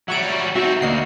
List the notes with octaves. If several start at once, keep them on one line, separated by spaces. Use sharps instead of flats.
F#3 G3 E5 C#6 D7
C4 D#4 F#4 E5 C#6
D2 A#3 D#5 C7